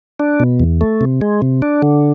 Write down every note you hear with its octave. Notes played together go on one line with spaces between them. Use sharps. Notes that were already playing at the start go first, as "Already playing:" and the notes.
D4
B2
E2
A3
C3
G#3
C3
D4
D3